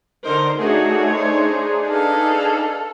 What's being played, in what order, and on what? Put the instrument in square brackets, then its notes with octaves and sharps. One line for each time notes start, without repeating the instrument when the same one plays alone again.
[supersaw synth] D3 D#4 A#4 [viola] C5
[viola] A3 C#5 [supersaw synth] D4 D#4 G#4 [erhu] F#4
[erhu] C5
[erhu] A4 [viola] B4 F5